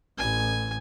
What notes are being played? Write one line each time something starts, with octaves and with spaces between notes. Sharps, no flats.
A1 G#5